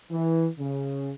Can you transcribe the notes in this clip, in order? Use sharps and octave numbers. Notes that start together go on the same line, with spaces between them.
E3
C#3